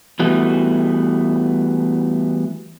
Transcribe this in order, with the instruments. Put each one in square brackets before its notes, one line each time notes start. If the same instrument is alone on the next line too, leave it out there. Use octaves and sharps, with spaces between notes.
[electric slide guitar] E3 G3 A3 B3 F#4